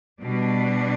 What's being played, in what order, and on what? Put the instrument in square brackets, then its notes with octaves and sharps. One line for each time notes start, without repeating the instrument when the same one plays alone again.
[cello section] B2 G3 D4